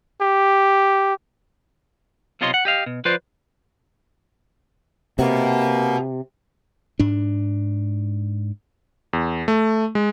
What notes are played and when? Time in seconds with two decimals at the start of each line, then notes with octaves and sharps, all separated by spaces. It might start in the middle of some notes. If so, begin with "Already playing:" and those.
0.21 G4
2.41 B1 C3 F4 C#5 D#5 C6
2.54 F#5
2.65 G4 D#5 F5
2.86 B2
3.05 F3 F4 B4 C5 D5
5.19 C3 A#3 F#4 B4
6.99 G#2 D4
9.13 E2
9.48 A3
9.95 G#3